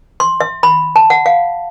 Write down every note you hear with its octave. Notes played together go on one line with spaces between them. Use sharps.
C6
E5
B5
A5
F#5
F5